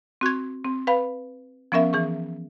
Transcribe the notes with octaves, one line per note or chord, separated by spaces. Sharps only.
C4 F#4 C#6 G#6
C4
B4 F5 B5
F3 B3 C#4 A#4 E5
E3 G#4 C#6